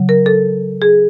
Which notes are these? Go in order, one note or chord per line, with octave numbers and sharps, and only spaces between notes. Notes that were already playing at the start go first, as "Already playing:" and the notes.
Already playing: C#3 F#3
A#4
A4
G#4